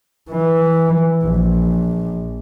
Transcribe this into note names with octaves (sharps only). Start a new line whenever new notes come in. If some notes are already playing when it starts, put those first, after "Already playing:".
E3
A#1